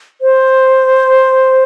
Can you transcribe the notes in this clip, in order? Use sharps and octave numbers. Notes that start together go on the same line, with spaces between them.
C5